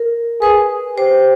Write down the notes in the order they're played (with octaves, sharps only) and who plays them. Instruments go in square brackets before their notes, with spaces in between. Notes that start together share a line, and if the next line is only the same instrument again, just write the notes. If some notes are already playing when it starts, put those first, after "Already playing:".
Already playing: [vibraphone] A#4
[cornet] G#4 [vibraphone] B4
[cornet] G4 [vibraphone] C5